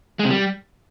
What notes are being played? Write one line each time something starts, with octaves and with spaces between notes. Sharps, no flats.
G#3
C3
G3